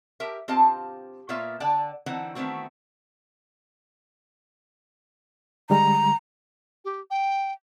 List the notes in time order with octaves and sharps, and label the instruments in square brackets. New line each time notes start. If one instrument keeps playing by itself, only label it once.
[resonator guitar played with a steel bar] G4 A#4 E5
C4 F4 G4 D#5 F5 A5
A#2 B3 F4 C#5 E5 F5
D3 D5 F#5 G5 A5
D3 E3 C4 D#4 F#5
D#3 E3 A3 B3 C4 F#4
[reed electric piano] D3 G3 G#3 [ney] A#5
[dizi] G4
G5